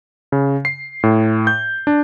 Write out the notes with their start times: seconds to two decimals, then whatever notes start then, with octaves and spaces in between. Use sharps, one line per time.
0.32 C#3
0.65 C7
1.03 A2
1.47 G6
1.87 D4